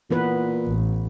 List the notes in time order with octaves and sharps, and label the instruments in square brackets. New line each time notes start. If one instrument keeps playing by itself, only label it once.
[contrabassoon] A#2 [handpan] E3 B3 B4
[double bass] A1